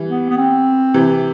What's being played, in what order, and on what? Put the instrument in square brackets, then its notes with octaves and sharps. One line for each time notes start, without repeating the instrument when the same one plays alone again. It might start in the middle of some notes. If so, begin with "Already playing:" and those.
Already playing: [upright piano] E3 G3
[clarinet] B3
B3
C4
[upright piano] C3 E3